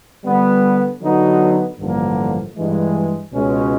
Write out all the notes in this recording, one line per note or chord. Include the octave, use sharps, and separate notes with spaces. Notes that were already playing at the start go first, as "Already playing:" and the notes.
D3 G3 B3
D3 F#3 B3 D#4 F#4
A1 G2 D3 F3 A#3
G2 E3 G#3
C#2 B2 G#3 C#4